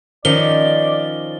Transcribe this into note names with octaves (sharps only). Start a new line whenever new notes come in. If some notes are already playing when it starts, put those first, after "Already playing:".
D#3 F3 C#4 D5 G7